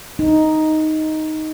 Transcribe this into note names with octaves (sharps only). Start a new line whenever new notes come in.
D#4